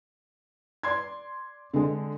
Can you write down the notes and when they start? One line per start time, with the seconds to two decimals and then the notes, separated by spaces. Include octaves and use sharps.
0.83 D5 C6 G#6
1.74 D3 G#3